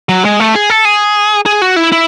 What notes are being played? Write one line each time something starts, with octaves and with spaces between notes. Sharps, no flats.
F#3
G#3
A3
G#4
A4
G#4
G#4
F#4
E4
E4